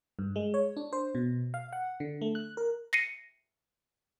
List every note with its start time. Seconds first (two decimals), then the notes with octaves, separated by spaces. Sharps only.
0.19 G2
0.36 G#3
0.54 C#5
0.77 D4
0.93 C5
1.15 B2
1.54 F5
1.73 F#5
2.00 D3
2.21 A3
2.35 F#6
2.57 A#4
2.93 A#6 C7 C#7 D#7